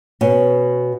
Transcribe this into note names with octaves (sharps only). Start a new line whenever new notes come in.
B2 C#4